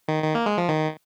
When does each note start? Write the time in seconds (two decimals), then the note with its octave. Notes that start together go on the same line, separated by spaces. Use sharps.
0.08 D#3
0.24 D#3
0.35 A#3
0.46 G#3
0.58 F3
0.68 D#3